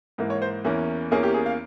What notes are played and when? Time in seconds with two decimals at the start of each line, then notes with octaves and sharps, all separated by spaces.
0.18 G#2 E3 A#3
0.30 C#5
0.42 C5
0.64 E2 E3 A#3 C#4
1.11 E2 E3 A#3 C#4 G#4
1.23 G4
1.34 G#4
1.46 F5